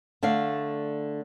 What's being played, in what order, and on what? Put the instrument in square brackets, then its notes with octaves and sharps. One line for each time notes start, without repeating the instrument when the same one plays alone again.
[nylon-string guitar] D3 A3 D5 F5